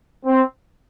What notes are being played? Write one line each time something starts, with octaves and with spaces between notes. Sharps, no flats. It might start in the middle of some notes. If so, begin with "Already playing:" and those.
C4